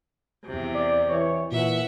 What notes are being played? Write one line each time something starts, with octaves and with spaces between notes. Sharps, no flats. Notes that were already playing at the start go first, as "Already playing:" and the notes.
E2 C3
D5
E3 C#5
A#2 E3 E5 F#5